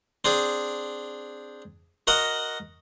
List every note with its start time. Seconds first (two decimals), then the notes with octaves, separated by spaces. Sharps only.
0.25 C4 D4 G#4
2.07 F#4 A#4 D#5 F#5